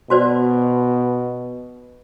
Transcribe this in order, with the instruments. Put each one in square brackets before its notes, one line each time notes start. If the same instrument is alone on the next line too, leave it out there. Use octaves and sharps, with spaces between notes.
[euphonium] B2 [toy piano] F#4 C5 D5